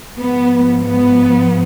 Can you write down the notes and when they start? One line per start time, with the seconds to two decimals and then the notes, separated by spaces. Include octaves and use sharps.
0.18 G#2 F3 B3
0.82 B3